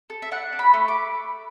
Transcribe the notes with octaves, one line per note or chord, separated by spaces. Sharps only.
A4
E5
D4 F#5
D4
B5
A3
D6